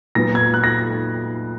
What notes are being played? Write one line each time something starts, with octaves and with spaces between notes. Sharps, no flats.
A#2 F#3 B3 A#6
G#6
F#6
A#6